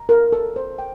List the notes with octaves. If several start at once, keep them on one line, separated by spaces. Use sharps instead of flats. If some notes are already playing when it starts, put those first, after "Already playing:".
Already playing: A#5
A#4
A4
C5
G5